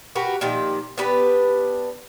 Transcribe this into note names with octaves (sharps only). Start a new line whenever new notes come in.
F#4 G4 A#4 B4
A#2 D#3 F3 G4
B3 D4 G4 B4